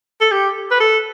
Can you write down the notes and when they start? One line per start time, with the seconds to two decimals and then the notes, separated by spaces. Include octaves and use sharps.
0.21 A4
0.31 G4
0.71 B4
0.80 A4